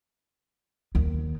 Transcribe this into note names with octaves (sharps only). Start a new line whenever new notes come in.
D#2